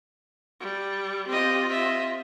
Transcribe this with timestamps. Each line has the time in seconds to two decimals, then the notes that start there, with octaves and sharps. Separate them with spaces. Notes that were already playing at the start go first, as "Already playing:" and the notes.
0.60 G3
1.27 C4 F4 G4 D#5
1.70 D#5 E5